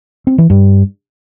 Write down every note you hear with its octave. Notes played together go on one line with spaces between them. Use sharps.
C4
E3
G2